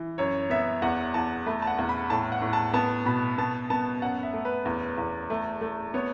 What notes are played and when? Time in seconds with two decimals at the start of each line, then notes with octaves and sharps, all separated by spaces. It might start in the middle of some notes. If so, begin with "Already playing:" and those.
Already playing: E3
0.18 F#2 C#5
0.50 B3 E5
0.82 E2 F#5
1.14 E2 A5
1.46 A3 B5
1.62 A5
1.67 F#5
1.78 E2
1.89 B5
2.10 A2 A5
2.32 F#5
2.42 A2
2.53 A5
2.73 B3 A5
3.06 B2 B5
3.38 B3 A5
3.70 B3 A5
4.02 F#2 F#5
4.23 E5
4.33 A3
4.45 B4
4.65 E2
4.98 E2
5.30 A3
5.61 A3
5.94 B3 C#5